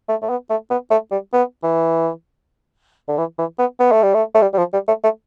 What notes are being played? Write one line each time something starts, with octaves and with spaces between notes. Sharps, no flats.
A3
A3
B3
A3
B3
A3
G3
B3
E3
D3
E3
E3
B3
B3
A3
G3
A3
A3
G3
G3
F3
G3
A3
A3